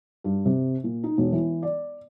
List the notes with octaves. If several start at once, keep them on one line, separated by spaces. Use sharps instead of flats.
G2
C3
A#2
D#4
E1
E3
D5